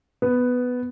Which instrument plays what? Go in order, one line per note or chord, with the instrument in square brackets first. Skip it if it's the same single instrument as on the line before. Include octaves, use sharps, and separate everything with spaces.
[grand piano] B3